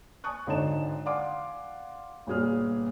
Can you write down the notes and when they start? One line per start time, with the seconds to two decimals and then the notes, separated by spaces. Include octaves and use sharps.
0.24 G#5 A5 C#6 D#6 F#6
0.47 G#1 D3 D#4 C#5 A5 E7
1.05 D5 F5 F#5 G#5 C6 D6
2.27 G1 A#2 G#4 F6